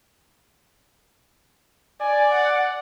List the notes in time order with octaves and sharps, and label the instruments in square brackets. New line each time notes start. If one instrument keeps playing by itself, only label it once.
[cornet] D5 [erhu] G#5
[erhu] F#5